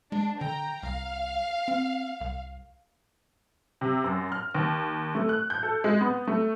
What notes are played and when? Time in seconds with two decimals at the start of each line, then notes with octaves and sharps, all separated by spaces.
0.12 G#3 D4
0.41 D3 G5 A#5
0.83 C2 F5
1.68 C4
2.21 C2
3.81 C3
4.04 F#2
4.32 F6
4.55 D#2
5.15 A3
5.29 F#6
5.50 G6
5.63 A4
5.84 G#3
6.01 B3
6.27 A3